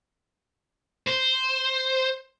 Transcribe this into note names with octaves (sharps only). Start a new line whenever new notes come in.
C5